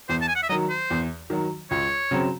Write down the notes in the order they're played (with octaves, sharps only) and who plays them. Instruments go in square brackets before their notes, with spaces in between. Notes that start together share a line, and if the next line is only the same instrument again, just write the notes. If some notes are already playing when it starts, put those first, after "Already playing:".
[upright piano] E2 [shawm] C5
[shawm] A5
G#5
F#5
E5
[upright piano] D#3 F#3 [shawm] D#5
[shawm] C5
[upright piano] E2
D#3 F#3
[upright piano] C#2 [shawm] C#5
[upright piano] C#3 F#3 C4